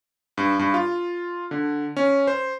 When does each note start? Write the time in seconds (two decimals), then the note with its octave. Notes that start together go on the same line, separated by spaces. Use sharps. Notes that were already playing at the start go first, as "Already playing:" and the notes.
0.38 G2
0.59 G2
0.74 F4
1.51 D3
1.97 C#4
2.27 C5